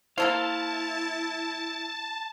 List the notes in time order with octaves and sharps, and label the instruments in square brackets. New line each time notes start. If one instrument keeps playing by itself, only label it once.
[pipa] A#3 A4 C5 [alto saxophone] E4 [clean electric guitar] F5 [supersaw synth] A5